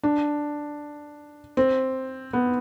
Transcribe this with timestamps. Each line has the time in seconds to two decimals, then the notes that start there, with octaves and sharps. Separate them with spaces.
0.03 D4
1.57 C4
2.33 B3